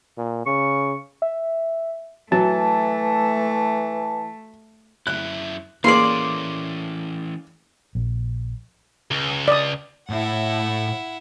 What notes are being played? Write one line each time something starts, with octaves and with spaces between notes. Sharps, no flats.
A#2
C#3 C#6
E5
E3 F#3 A3 A5
F#2 E4 F#6
E3 A#3 C#4 G#4 D5 C6
A#1
C#2
D5 D#6
A2 E4 E5 F#5